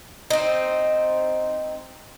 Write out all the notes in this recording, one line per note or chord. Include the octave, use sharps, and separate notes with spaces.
C4 D#4